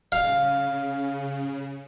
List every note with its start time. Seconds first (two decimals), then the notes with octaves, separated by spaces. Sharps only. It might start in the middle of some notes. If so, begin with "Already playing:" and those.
0.12 C#3 F5